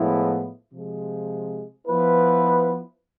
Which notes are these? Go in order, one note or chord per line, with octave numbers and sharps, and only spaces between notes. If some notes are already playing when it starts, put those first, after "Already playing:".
Already playing: A2 F3 G#3 B3 E4
C3 F3 G#3
F3 B3 E4 B4